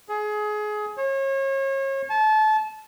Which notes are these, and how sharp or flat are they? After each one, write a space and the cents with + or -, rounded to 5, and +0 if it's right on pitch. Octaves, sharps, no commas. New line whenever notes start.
G#4 +25
C#5 -35
A5 -25